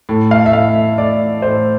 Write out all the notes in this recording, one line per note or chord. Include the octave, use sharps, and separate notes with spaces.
A2
F5
E5
A2 F5
E5
A2 D5
A2 C5